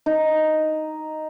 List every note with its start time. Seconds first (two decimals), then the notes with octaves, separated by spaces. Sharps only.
0.06 D#4